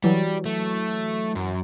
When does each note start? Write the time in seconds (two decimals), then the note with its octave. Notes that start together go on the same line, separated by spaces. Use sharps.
0.04 E3 F#3 G3
0.46 A3
1.35 F#2